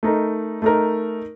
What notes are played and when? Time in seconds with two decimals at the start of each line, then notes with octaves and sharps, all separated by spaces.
0.03 A3 D#4 A#4
0.62 A3 D#4 A#4